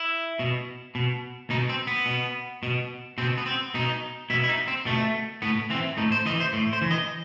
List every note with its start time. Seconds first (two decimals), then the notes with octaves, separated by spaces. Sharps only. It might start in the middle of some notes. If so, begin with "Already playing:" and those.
Already playing: E4
0.39 B2
0.95 B2
1.50 B2 D#4
1.69 C4
1.87 B3
2.06 B2
2.63 B2
3.18 B2 C4
3.38 B3
3.46 C4
3.74 B2 D#4
4.30 B2 E4
4.44 E4
4.49 D#4
4.68 C4
4.85 B2 A3
5.42 A2 B3
5.70 E3 C4
5.97 A2 D#4
6.12 C5
6.26 E3 D#5
6.40 C5
6.53 A2
6.73 C5
6.81 E3
6.91 D#5